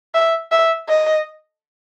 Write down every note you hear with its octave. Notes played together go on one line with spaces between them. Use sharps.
E5
E5
D#5